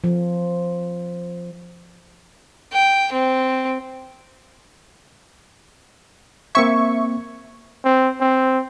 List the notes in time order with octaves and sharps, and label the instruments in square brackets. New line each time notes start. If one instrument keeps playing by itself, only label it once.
[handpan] F3
[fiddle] G5
C4
[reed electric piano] A#3 C4 G#6 [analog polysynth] E5 C#6
[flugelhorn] C4
C4